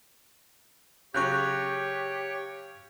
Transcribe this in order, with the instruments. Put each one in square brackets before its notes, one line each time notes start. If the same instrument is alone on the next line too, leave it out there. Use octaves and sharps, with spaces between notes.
[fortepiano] C#3 F#3 C#4 [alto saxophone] G4 [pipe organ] C#5 [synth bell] C#6 F#6 G6